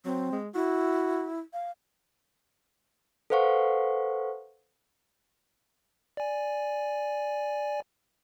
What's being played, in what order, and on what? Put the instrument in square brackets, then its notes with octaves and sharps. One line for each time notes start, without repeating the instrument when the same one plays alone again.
[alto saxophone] F#3 [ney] C4
[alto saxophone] G#3
[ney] E4 [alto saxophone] F#4
[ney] F5
[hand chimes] A4 B4 C5 F5 F#5 C#6
[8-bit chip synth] D5 G#5